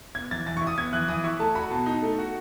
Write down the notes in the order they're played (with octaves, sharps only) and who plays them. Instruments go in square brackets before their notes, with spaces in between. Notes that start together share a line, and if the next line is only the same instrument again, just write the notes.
[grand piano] B3 [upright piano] G#6
[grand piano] E3 [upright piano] A6
[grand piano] E3 [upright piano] A6
[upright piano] C#6
[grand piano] E4
[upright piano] D#6
[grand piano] B3 [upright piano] G#6
[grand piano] E3 [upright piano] F#6
[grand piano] E3 [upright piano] D#6
[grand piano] E4 [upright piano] C#6
[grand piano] A3 [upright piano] A5
[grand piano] F#4 [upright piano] B5
[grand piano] B2 [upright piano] A5
[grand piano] D#4
A3
F#4